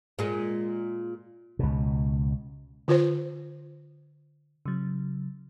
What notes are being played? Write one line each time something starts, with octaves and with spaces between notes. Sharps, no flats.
A#2 G#3
C#2 B2
D3 F4 B4 C5
C#3 F#3